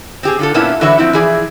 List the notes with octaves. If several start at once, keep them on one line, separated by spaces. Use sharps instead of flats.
C4 G4 G#4
D3 F4 A4
A#2 A#3 B3 C#4 E4 A5
D3 E3 F#4 B4 C#5 E5
F3 C4 E4
E3 F3 E4 G#4 D5